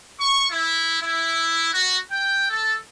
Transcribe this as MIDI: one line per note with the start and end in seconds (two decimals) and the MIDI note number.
0.19 0.44 85
0.51 0.99 64
1.00 1.70 64
1.73 1.97 66
2.10 2.47 79
2.49 2.76 69